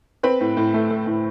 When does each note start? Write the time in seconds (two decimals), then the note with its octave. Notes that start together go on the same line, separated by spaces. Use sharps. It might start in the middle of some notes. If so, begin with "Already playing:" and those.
0.23 C4 B4 B5
0.41 A2
0.57 A2
0.74 A3
0.90 A3
1.07 A2